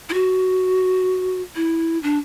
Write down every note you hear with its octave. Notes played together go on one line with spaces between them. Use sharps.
E4
F#4
E4
D4